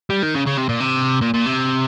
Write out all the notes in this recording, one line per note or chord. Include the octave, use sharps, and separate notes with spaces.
G3
D#3
C#3
C#3
C3
A#2
C3
A#2
A#2
C3